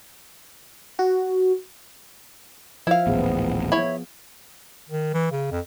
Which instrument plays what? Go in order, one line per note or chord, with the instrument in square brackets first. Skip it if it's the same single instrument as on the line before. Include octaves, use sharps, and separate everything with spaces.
[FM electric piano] F#4
[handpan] F3 [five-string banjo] E4 F5
[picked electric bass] D#1 A1 [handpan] B3 G#4
[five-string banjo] E4 C#5
[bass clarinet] D#3
E3
C#3
F2